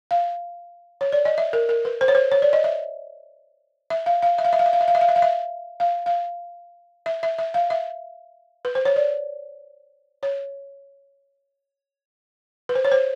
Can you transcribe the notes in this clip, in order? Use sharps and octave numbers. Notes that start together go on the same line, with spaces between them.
F5
C#5
D5
D#5
E5
A#4
A#4
B4
C5
C#5
C5
C#5
D5
D#5
E5
E5
F5
F5
E5
F5
E5
F5
E5
F5
E5
F5
E5
F5
E5
F5
E5
F5
F5
E5
E5
E5
F5
E5
B4
C5
C#5
D5
C#5
B4
C5
C#5
C5